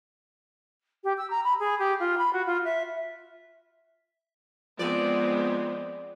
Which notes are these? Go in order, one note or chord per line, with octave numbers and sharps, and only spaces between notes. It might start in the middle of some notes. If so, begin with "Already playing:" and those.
G4
E6
A#5
B5
G#4
G4
F4
B5
F#4
F4
E5
F3 G#3 B3 C4 D5